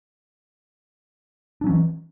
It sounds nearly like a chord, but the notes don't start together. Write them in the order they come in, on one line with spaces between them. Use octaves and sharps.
D4 F#3 C#4 E3